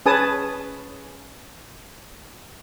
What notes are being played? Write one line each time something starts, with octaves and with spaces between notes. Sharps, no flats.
C#4 G#4 B4 G#5 A5 D#6